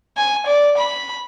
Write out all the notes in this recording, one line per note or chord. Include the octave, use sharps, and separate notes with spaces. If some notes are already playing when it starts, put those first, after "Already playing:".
G#5
D5
B5